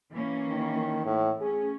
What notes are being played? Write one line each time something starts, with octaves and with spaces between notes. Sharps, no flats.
E3 A#3 C#4
D#3
A2
A3 C#4 G#4